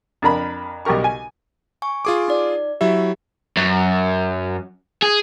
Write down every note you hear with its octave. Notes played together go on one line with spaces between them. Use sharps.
F2 D4 A#4 A#5 B5
B1 G3 G4 A#4 C#6
G#5
G#5 C#6
F4 G#4 D6
D#4 D5
F#3 E4 G4 E5
F#2
G#4